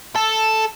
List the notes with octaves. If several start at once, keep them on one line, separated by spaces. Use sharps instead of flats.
A4